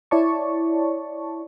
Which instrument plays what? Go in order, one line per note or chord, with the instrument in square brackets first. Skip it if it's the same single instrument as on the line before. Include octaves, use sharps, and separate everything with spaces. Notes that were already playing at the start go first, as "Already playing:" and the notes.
[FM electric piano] E4 C#5 D5 A5 C#6